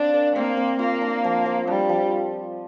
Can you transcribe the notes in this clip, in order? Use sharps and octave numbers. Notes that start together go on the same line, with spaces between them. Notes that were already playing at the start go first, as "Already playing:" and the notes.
Already playing: C4 D4 F5
A#4
A#3 C4
C4
A#3 F4
D4
F3
F3
G3 D4
F3